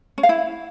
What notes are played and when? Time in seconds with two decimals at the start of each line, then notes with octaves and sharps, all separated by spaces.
0.18 C#4
0.23 F5
0.29 E4